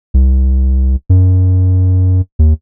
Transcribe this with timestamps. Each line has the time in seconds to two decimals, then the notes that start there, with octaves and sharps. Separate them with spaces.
0.14 C2
1.10 F#2
2.39 D#2